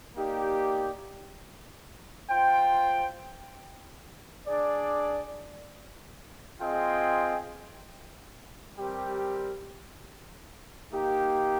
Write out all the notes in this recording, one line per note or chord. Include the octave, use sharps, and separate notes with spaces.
A#3 D#4 G4 D5
F4 C5 G5
D4 G#4 D5
C4 F4 G#4 D#5 G5
G3 C4 G4 A#4
A#3 D#4 G4